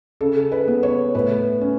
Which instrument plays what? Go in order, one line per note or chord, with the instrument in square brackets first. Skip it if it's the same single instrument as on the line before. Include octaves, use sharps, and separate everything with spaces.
[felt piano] C#3 A4
B4
B3
C#5
A2 B4
C#4